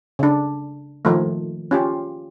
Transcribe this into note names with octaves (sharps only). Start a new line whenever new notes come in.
C#3 D4
D#3 F3 A3
C#4 F4 G4